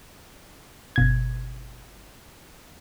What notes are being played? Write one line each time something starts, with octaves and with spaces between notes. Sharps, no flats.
G1 B2 G#6